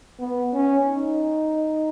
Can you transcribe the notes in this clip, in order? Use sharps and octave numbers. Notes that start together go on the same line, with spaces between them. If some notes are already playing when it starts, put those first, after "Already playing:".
B3
C#4
D#4